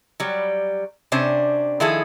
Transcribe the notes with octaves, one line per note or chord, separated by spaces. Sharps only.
F#3 G3
C3 C#4 D4 C5
D#3 F3 E4 G#4 A4